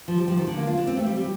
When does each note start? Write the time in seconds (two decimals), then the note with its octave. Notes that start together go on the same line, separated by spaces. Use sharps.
0.08 F3
0.18 G3
0.28 F3
0.37 D#3
0.47 D3
0.57 A#3
0.67 F4
0.77 D4
0.87 C4
0.97 A3
1.06 G3
1.16 G3